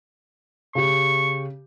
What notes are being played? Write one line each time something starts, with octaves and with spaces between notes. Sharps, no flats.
C#3 G4 C#6